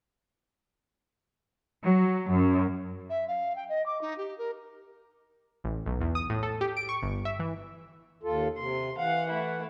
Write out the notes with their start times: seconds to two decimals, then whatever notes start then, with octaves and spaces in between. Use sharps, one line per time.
1.84 F#3
2.31 F#2
3.10 E5
3.28 F5
3.56 G5
3.69 D#5
3.86 D6
4.01 D#4
4.18 G4
4.38 A#4
5.64 A1
5.86 B1
6.01 E2
6.15 D#6
6.30 A2
6.43 A4
6.61 G4
6.77 D7
6.89 C#6
7.02 G1
7.25 E5
7.40 E3
8.23 D#2 F4 A4
8.57 C3 C6
8.97 E3 F5 F#5
9.30 A3 E4